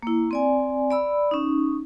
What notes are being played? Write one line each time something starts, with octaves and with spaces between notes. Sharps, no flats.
A#3 E4
C4 D5 G#5
D5 B5 E6
C#4 D#4